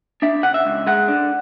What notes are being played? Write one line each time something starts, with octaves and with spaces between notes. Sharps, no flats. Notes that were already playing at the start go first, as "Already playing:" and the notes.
D4 E5
C#3 F#5
E5
C#2
G#3 F#5
D4